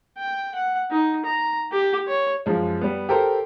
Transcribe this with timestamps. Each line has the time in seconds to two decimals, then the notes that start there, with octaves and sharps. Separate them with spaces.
0.18 G5
0.55 F#5
0.91 D#4
1.25 A#5
1.72 G4
2.08 C#5
2.46 F#2 F3 G#3
2.81 G3 B3
3.09 G4 A4 A#4 C5